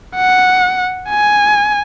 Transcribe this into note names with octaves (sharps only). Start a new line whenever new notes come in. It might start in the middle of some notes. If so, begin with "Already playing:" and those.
F#5
G#5